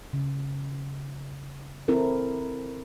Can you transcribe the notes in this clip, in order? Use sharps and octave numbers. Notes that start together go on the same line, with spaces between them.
C#3
C4 E4 A4 A#4